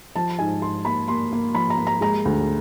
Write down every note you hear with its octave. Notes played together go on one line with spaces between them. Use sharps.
F3 A5
G#2 G#5
G#2 C6
A#3 B5
A#3 C6
A#3
F3 B5
A#5
A#3
A#5
G#3 A#5
D2